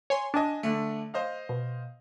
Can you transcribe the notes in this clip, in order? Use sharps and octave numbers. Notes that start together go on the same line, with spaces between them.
C#5 G#5 C6
D4 D#5 G#5 A5
D3 A3
C5 D#5 F5
B2